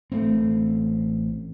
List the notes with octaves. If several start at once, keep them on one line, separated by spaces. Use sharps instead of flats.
A1 A3 C4